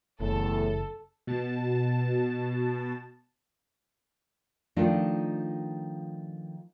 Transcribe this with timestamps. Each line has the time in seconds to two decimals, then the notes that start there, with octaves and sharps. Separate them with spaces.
0.20 F#1 E2 A2 A4
1.27 B2 A5
4.76 D#3 F3 A3 D4 D#4 F4